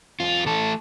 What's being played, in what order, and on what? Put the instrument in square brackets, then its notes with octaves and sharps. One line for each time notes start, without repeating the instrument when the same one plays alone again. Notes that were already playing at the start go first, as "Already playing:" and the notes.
[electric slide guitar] E2 F4
E3 A3 A4